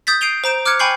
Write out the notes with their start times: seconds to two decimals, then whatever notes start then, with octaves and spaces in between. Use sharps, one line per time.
0.07 D#6 G6 A6 B6
0.21 G6 C7 D7 D#7 F7 G7
0.44 C5 A#5 D7 E7
0.65 D6 F6 F#6 G#6 C#7
0.79 G5 G#5 B5 C#6 G6 C7